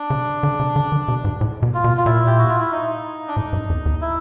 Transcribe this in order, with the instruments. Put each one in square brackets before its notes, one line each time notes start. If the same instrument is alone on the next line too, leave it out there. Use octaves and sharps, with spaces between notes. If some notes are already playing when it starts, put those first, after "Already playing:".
Already playing: [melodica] D4
[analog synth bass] C#3
D3
C#3
D3
D#3
C3
G#2
A2
B2
[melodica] F4
[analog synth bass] B2
[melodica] F4
[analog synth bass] A#2 [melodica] E4
[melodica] G4
F#4
F4
E4
D#4
D4
[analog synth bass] A2 [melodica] D#4
[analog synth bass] G2
F2
E2
[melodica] E4